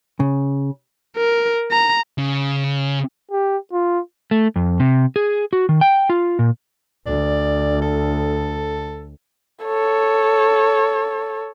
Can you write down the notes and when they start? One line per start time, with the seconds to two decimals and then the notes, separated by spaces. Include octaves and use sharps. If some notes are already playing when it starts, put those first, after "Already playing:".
0.20 C#3
1.17 A#4
1.72 A#5
2.18 C#3
3.31 G4
3.72 F4
4.31 A3
4.56 F2
4.80 C3
5.16 G#4
5.53 F#4
5.69 D#3
5.81 G5
6.10 F4
6.39 A#2
7.06 D2 D5
7.82 A4
9.65 A4 C#5